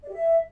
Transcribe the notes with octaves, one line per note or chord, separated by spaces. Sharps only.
D5
G4
E5